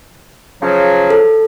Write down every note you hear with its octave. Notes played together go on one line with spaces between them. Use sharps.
C#3 F3 F#3
A4